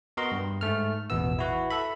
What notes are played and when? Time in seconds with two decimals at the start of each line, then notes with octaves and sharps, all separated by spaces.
0.17 B3 F#4 A#4 D#5 C6
0.32 G2
0.61 G#2 A3 F6
1.10 A1 E2 B2 B3 E6
1.39 E4 F#4 B4
1.70 A4 E5 B5